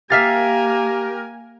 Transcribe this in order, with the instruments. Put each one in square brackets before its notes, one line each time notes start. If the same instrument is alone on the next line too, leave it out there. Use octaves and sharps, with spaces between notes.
[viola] A#3 G#5 [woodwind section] G4 A#4 [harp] E5 F5 A6